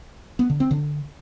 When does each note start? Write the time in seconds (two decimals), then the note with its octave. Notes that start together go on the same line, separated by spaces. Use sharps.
0.39 B3
0.50 D3
0.60 C4
0.71 D3